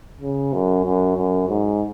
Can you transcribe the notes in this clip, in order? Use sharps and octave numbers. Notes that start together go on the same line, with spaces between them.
C#3
F#2
F#2
F#2
G#2